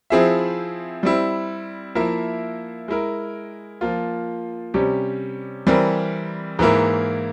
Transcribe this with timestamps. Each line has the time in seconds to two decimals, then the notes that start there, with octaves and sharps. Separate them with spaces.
0.10 F3 C4 E4 G#4 E5
1.03 G3 C4 E4
1.95 F3 A#3 E4 A#4 E5
2.88 G#3 E4 A#4
3.81 F3 A#3 F4
4.74 C3 G3 C#4 G4
5.67 E3 G3 C4 G4 A#4
6.59 G#2 E3 A#3 E4 A#4